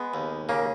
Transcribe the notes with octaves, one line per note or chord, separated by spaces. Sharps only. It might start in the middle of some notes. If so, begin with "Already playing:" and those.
Already playing: G#3 B3
D#2
C#3 A#3